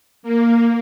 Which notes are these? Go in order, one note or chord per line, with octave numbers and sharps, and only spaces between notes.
A#3